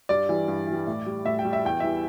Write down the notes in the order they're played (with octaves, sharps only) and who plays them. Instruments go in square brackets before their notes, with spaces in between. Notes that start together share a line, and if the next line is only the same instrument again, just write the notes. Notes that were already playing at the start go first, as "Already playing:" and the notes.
[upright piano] G2 D5
E3 G3
G2
E3
G3
A2
G3
A2 E5
G5
G3
E5
E2 G5
E3 G3 E5